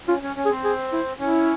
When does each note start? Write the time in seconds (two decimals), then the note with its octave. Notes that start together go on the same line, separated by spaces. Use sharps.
0.08 C#4 F4
0.22 C#4
0.36 C#4
0.45 G#4
0.50 C4
0.64 G#4
0.92 E4
1.20 C#4 E4